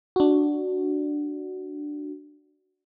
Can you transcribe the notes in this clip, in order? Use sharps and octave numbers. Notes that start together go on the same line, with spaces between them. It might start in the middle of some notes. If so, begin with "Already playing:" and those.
D4 F#4